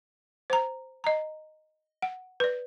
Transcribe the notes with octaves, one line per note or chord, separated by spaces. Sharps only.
C5 A#5
D#5 A#5
F#5
B4 D5